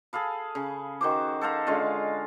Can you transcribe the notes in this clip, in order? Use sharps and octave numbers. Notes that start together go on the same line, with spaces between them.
G#4 A4 F5 B5
C#3
D#3 F#4 C5 D6
A4 C5 F5 A#5
D3 G#3 C#4 F4